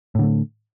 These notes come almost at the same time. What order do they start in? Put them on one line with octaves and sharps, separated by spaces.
A2 D3 A3